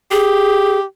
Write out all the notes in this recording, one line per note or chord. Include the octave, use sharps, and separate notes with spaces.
G4 G#4